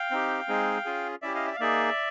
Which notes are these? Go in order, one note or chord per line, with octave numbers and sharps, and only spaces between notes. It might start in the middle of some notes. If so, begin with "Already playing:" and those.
Already playing: F5 G5
C4 D#4 G4
G#3 C4 D#4 G#4
C#4 F4 G#4
C#4 E4 G4 D5 E5
D#5 F5
D5 E5
F5
A#3 D#4 G#4 D5 E5